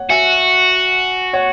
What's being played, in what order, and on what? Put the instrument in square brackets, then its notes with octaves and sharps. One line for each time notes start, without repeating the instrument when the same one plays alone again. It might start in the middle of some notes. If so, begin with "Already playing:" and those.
Already playing: [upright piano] C#5 F#5
[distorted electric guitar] F#4 [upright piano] E5 G#5
[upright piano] C#5 F#5